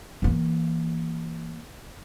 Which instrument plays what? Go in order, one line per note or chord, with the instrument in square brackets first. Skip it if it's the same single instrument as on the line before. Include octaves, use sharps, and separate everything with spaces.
[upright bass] E3 A#3